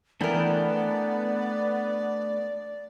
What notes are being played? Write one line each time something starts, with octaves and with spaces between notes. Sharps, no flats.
E3 A3 B3 D4 A#4 D5 G5